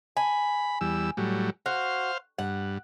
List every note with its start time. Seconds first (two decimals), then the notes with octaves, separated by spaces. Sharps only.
0.17 G#5 B5
0.81 E2 G3 E6
1.17 A2 F#3 G3
1.66 F#4 C5 F5
2.38 G2 F#5